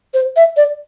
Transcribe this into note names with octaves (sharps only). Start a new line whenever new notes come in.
C5
E5
D5